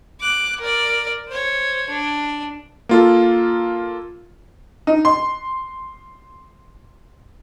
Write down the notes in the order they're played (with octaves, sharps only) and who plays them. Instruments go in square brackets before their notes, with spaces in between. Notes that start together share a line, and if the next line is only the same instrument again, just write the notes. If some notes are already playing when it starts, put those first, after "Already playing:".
[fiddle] D6 F#6
A#4 D5
C5 C#5
D4
[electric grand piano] A#3 F4 A4
[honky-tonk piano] D#4
C6